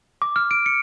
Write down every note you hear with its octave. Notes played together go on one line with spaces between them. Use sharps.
D6
F6
D7
C#7